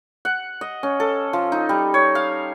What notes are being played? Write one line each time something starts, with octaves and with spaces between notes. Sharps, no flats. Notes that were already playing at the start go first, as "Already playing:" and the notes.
F#5
D#5
C#4
A4
F3
D#4
G3
C#5
F5